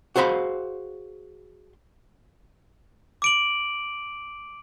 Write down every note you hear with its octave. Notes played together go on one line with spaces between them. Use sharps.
F#4 G#4 C5 F5 B5
D6 D7 F#7